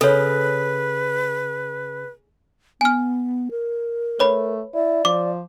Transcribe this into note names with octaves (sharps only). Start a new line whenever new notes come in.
C#3 A4 B4 C#5
B3 G#5 F6
A#4
A3 B4 C#5 B5
E4 D5
F3 D6